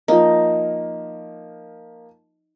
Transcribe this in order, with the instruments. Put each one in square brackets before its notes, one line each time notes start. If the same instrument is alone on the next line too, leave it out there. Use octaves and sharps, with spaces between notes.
[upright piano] F3 A#3 [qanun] D#4